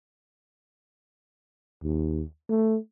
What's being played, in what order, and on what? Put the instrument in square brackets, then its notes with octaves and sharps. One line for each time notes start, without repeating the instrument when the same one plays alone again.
[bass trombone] D#2
A3